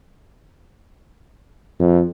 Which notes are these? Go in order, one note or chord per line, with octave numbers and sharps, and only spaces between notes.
F2